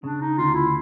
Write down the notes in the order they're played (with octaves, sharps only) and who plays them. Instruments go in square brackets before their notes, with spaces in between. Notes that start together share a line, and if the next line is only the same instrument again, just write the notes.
[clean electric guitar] C#3 [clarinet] D4
[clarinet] D#4
[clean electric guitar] D2 [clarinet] F4
[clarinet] E4